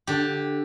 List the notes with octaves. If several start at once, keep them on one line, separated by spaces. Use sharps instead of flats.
D3 G4